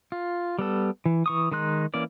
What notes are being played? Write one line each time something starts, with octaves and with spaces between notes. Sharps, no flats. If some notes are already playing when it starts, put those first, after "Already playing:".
F4
G3 B3 A4
E3
E3 C#6 D#6
D#3 G#3 D#4 C6 F#6
E3 A#3 C#4 D5